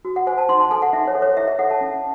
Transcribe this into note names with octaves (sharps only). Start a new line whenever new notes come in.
F#4
F#5
C5 G#5
A5
D#4 C6
A5
A4 G#5
F#5
D#4 E5
C#5
A4
C#5
E4 E5
E5
A4 F#5
A5
C#4